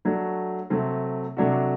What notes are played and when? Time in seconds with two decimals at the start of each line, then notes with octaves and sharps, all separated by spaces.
0.05 F#3 A3 D4 F#4
0.70 C3 F#3 A3 C4
1.37 C3 F#3 A3 D4 F#4